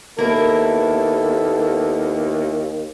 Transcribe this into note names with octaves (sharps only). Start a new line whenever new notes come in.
D#2 A#3 B3 E4 A4 A#4